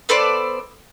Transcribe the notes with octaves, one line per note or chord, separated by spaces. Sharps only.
B3 A4 C5 D5